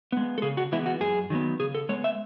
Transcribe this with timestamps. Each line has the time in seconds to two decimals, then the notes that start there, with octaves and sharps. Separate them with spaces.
0.12 G#3 B3
0.38 A4
0.42 C#3 G#4
0.57 F#4
0.72 E3 G#3 B3 E4
0.86 F#4
1.00 F#2 G#4
1.30 D#3 F#3 B3
1.60 C#3 G#4
1.75 A4
1.89 G#3 B3 C#5
2.04 E5